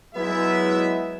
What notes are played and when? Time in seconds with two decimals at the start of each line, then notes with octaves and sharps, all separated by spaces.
0.15 F#3 G#3 B3 E4 E5